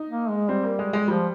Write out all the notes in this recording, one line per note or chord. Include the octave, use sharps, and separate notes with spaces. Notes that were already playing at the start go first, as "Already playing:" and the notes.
Already playing: D#4
A#3
G#3
G3 C4
A#3
G#3
G#3
F3 G3